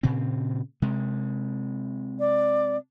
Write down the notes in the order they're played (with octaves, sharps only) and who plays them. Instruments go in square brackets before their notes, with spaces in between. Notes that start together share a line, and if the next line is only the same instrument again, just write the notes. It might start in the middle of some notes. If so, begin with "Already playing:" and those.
[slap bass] A#2 C#3 C4
C3 G#3
[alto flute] D5